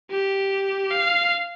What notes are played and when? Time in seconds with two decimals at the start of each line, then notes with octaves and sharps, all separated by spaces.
0.10 G4
0.90 F5